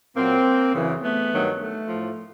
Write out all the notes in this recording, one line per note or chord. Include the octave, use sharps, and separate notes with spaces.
A#2 F#3 A#3 C4
F#2 C#3 E3
A3 B3
G2 D#3 F#3
A3
A2 F3